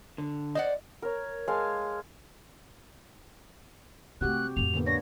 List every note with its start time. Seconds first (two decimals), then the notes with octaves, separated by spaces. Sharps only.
0.18 D3
0.55 C5 D5 D#5 F#5
1.02 A#4 C#5
1.48 G#3 F5 G#5 A5
4.21 C3 G#3 A3 F#4 G4 F#6
4.57 F2 A2 F7
4.74 D3 A#3 B3
4.86 D4 C#5 A#6